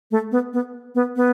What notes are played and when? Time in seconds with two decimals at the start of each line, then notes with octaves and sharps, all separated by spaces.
0.11 A3
0.32 B3
0.53 B3
0.95 B3
1.16 B3